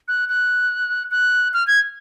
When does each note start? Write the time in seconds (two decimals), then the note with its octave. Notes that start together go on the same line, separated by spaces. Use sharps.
0.08 F#6
0.29 F#6
1.11 F#6
1.54 F6
1.67 G#6